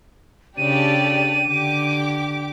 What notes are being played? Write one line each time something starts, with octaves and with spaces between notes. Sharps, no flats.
C#3 D4 G4 A4 D5 D#7
D3 G4 D6